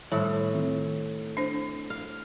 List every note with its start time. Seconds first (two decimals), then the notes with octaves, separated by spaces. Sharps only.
0.12 A2 D#3 G3 A4 C5
0.55 D#3 C4 F4
1.37 D4 C5
1.90 F5